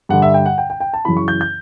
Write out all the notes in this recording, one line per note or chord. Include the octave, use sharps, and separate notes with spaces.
G2 D3 F#5
E5
G5
F#5
G5
G5
G5
A5
F#2 C#3 E3 B5
C#6
G6
G6